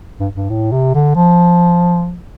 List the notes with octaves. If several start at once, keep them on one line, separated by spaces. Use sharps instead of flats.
G2
G2
A2
C3
D3
F3